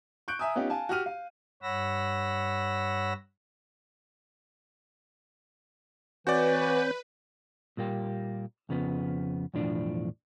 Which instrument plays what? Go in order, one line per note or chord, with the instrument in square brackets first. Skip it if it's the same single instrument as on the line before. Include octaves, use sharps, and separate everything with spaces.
[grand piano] C#6 F#6 G6 D7
E5 G#5 A#5 D#6
B3 C#4 D#4 F4 G4
F5 G#5 A5
F#4 G4 F6 D#7
F5
[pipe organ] G2 C#5 F#5 B5 E6 A#6
[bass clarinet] E3 [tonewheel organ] C4 C#5 G6 [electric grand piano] F#4 D5 [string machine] B4
[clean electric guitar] A#2 G3 A#3 G4
F2 C#3 F3 B3
B1 E2 A2 F3 D4